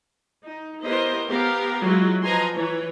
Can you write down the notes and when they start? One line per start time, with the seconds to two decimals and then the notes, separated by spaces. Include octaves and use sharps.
0.43 D#4
0.82 B3 E4 G4 A#4 C5 D#5
1.29 B3 G4 A#4 F5
1.83 F#3 G#3 E4 F4
2.22 F3 B4 D#5 G#5 A#5 C6
2.53 E3 C#5